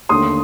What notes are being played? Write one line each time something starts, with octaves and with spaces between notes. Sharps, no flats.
D#2 D3 A3 C6 D#6